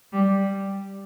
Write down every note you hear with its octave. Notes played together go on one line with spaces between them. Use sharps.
G3